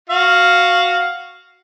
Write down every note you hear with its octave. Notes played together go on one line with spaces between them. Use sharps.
F#4 F5